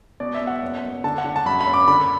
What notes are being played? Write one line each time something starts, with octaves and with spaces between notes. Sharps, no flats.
B2 D5
E5
B2
F#5
F#1
F#1
D3 A5
F#5
D3
A5
F#2 B5
B5
F#1
D6
D3 B5